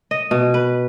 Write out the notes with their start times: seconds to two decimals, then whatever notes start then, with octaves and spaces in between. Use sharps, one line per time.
0.11 D#5
0.31 B2
0.54 B4